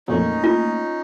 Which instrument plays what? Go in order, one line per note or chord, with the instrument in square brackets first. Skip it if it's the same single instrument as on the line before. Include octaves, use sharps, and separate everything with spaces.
[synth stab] F2 A#2 F#3 [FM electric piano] A3 A#3 [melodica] C#4 D#4
[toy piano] F4